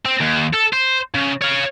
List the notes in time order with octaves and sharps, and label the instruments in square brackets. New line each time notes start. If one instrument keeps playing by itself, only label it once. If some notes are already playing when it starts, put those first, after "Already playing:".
[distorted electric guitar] C4
D#2
A4
C5
C#3
C#5 F5